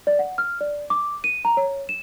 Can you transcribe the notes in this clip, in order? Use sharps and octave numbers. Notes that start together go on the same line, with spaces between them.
D5
F#5
F6
D5
D6
D#7
A#5
C#5
E7